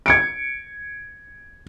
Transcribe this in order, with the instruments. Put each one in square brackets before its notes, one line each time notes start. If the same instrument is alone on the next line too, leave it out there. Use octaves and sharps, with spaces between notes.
[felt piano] G#6 C#7 D7